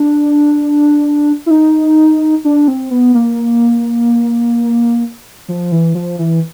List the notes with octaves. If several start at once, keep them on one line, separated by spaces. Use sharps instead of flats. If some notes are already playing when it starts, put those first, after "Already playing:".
Already playing: D4
E4
D#4
D4
C4
B3
A#3
F3
E3
F3
E3